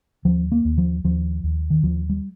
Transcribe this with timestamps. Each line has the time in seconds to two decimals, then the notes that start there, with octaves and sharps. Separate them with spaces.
0.25 D#2 F3
0.52 A#3
0.65 D#2
0.78 F3
1.04 D#2 F3
1.44 D#2
1.70 D#3
1.83 D#2 F3
2.09 G3